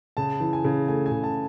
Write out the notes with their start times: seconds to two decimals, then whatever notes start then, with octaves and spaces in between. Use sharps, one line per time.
0.17 C#3 A5
0.40 E3
0.53 G#5
0.64 C#3
0.88 A3 G#5
1.06 G#5
1.12 C#3
1.23 A5